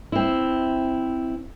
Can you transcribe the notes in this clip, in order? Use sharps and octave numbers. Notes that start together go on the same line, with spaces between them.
C4 E4